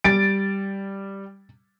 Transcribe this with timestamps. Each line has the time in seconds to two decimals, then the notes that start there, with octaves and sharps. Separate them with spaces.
0.04 G3 A6 D7